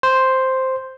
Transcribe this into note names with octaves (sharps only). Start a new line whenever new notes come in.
C5